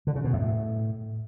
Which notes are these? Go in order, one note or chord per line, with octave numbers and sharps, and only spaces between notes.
D3
C#3
B2
F#2
A2